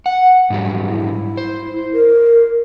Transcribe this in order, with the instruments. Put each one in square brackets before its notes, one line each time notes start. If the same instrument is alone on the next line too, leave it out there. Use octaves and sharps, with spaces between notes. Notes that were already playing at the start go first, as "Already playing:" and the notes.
[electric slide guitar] F#5
G#2 F#3 G3
[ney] E4
[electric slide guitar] C5
[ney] A#4